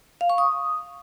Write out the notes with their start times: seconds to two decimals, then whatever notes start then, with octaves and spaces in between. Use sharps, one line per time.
0.21 F5
0.30 C#6
0.38 D#6